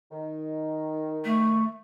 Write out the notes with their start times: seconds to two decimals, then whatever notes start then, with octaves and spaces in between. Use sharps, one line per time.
0.11 D#3
1.24 A3